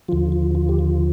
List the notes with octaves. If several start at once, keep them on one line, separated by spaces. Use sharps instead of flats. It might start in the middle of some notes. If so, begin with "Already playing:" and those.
D#2 D3 F3 F4
F4
F4
G4
F4